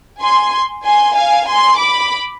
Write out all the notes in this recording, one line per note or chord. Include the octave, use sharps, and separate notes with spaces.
G#5 C6
G#5 C6
F5 G#5
G#5 C6
B5 D6